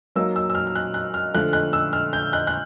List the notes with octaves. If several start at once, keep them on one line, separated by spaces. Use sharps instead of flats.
F#3 A#3 D#4 E6
E6
E6
F6
F6
F#6
F#6
F6
D3 F3 A3 F#6
F#6
E6
F6
G6
F#6
F#6